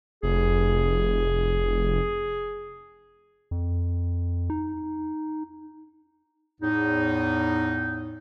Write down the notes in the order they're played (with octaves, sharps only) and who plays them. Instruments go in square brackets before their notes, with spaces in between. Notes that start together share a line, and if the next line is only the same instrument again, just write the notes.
[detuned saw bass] F1 [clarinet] G#4
[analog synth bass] F2
D#4
[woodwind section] E2 A2 D#4